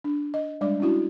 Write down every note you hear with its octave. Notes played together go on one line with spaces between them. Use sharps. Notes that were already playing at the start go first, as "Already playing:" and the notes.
D4
D#5
G3 G#3 D4 D5 D6
C#4 D4 E4 F#4